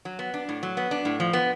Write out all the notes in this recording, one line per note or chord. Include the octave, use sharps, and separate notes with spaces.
F#3
B3
D4
A2
F#3
B3
D4
A2
F3
B3